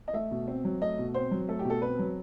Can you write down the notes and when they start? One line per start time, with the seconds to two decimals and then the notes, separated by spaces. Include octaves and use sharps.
0.08 D#5
0.13 A3 E5
0.31 B2
0.48 C4
0.65 F#3
0.81 A3 D#5
0.99 B2
1.14 C4 C5
1.31 F#3
1.49 A3 A4
1.59 G4
1.65 B2 A4
1.82 C4 B4
1.99 F#3